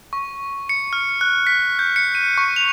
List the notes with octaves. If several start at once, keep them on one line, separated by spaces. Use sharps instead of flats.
C#6
C#7
F6
F#6
B6
G6
C#7
D#7
C#6
F7